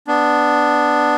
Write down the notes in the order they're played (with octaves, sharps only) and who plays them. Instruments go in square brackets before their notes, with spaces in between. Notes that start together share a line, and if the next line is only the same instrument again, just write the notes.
[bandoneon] B3 D4